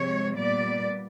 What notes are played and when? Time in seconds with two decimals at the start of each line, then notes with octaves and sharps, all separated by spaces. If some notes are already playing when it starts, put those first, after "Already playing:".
Already playing: C3 F3 G#3 C4 C#5
0.37 A#2 G3 B3 D5